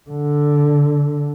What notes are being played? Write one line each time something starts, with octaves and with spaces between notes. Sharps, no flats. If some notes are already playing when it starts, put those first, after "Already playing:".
D3